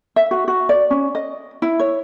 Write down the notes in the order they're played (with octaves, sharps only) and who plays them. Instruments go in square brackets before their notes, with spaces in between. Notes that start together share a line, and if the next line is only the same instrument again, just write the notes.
[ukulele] E5
F#4
F#4
D5
C#4
D#5
E4
C#5